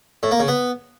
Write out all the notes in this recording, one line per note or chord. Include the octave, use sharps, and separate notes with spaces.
A2
A#3
C#3
B3